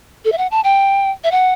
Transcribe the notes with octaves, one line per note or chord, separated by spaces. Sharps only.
A4
E5
F#5
A5
G5
E5
F#5